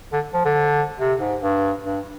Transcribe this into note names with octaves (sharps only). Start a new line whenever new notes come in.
D3
F3
D3
C3
G#2
G2
G2